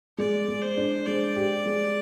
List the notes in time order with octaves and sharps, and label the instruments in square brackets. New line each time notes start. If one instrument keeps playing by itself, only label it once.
[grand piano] G#3 [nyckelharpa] D5
[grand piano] G#3
[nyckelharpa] C5
[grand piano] D4
[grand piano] G#3 [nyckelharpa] D5
[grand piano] G4
G#3